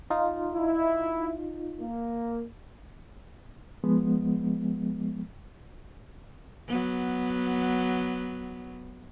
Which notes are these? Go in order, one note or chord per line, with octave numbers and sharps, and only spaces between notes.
D#4 F4
E4
A#3
F3 G#3 B3
F#3 B3